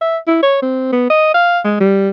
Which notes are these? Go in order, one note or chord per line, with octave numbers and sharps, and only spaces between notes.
E5
E4
C#5
C4
B3
D#5
F5
G#3
G3